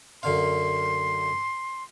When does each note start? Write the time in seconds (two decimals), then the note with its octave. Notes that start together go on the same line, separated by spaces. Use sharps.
0.23 F#2 D3 F5 C6